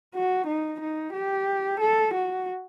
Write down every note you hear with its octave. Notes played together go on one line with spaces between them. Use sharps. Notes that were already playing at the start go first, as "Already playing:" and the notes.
F#4
D#4
D#4
G4
A4
F#4